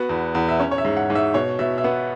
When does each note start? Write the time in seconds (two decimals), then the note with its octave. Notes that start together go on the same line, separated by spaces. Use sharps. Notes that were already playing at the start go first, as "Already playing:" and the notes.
Already playing: B3 F#4
0.09 E2
0.35 E2
0.49 E5
0.60 C#4 C#5
0.71 C#5
0.78 E5
0.85 G#2
0.97 F#5
1.10 G#2
1.15 E5
1.34 B2 C#5
1.59 B2 E5
1.78 E5
1.84 B3 F#5